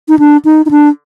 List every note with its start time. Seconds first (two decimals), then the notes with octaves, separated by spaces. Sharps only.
0.09 D#4
0.19 D4
0.45 D#4
0.66 D#4
0.71 D4